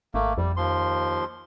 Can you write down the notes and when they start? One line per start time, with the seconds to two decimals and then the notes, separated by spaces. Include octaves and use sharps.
0.14 G#1 A3 A#3
0.38 F2 G3
0.57 D#2 F3 C6